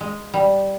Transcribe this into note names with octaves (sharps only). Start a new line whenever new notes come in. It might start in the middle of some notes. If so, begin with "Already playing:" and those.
G#3
G3